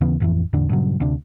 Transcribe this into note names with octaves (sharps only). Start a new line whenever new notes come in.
D#2 C#3 E3 B3
A1 F2 E3
E2 A2 D3 D4
G2 A#2 C#3 F#3
D2 C3 D4